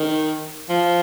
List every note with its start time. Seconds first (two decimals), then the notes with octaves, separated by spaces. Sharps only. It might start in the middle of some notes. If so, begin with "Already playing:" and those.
Already playing: D#3
0.69 F3